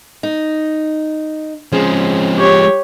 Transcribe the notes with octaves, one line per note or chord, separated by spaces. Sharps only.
D#4
F3 G#3 C4 C#4 G#4
G4 C#5